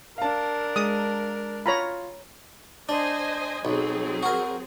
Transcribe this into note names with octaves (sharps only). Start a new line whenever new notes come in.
D4 A#4 F5 A5
G#3 D#6
F4 C#5 A#5 B5
D4 C5 D#5 G#5
B1 F#3 C4 G#4
F#4 A#4